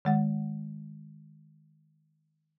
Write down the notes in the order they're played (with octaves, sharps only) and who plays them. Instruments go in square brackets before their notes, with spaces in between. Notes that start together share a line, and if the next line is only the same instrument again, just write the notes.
[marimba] D#3 G#3 F#5